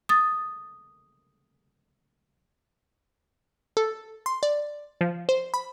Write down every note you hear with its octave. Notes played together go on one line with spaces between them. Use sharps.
D#6 A6
A4
C6
D5
F3
C5
B5